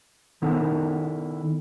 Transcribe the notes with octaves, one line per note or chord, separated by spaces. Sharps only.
D#3 B3 D#4 E4 A4 A#4